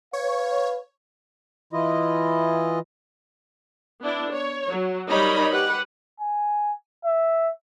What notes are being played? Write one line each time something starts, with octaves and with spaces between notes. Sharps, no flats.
B4 C#5 F5
E3 E4 F4 D#5
B3 D4 E4
C#5
F#3
G3 D#4 A#4 C#5 D#5 B5
G4 B4 F#5
G#5
E5